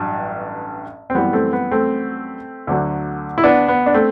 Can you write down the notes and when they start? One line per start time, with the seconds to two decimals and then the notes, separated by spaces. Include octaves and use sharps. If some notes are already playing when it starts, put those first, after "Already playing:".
Already playing: A1 G2 F#3
1.10 C4
1.15 F#2 E3 G3 B3
1.33 A3 C4
1.53 B3
1.71 A3 C4
2.67 D2 D3 F#3
3.38 E4
3.44 B3 D4
3.68 B3
3.86 D4
3.94 A3 C4